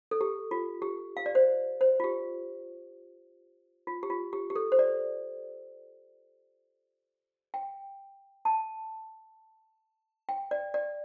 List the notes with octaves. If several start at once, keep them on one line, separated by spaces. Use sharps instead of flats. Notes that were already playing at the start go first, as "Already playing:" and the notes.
A4
G4
F4
G4
F5
D5
C5
C5
F4
G4
F4
G4
F4
G4
G4
A4
C5
D5
G5
A5
G5
D5
D5